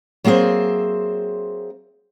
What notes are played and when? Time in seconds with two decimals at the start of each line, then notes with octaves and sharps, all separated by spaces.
0.24 F#3 A#3 C4 G#4 C5 E5